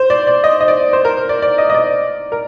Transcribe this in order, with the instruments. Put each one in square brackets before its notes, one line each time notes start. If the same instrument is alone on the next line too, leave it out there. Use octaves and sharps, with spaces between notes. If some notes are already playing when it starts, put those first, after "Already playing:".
Already playing: [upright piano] C5
D5
D5
D#5
D#5
D5
C5
A#4
C5
D5
D5
D#5
D#5
D5
A#4